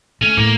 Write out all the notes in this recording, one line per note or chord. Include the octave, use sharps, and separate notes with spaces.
A3 C#4
A2 A#3